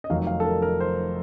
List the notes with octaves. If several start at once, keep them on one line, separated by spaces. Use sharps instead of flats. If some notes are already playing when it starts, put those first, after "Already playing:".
D#5
F1 F2 D#3 F#3 F5
F5
A4
A#4
A#4
C5